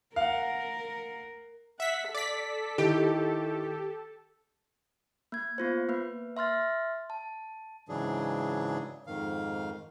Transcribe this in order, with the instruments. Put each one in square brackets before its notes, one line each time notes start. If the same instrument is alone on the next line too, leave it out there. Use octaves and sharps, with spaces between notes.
[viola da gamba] A#4 [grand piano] F5 F#5
[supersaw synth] E5 B6 [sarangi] F#5
[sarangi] A4 [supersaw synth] D5 B6
[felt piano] D#3 E4 D7 [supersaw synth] G4
[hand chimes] A#3 G#6
B3 F4 C5
A#3 B4
E5 C6 F6 A6
A5
[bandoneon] G#2 C#3 E3 F#3 D4 G#4
F2 G#2 D#3 F5